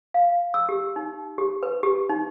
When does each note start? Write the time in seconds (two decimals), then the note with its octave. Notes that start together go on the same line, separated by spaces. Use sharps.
0.14 F5
0.54 E6
0.69 G4
0.96 D#4
1.38 G4
1.63 B4
1.83 G4
2.09 D#4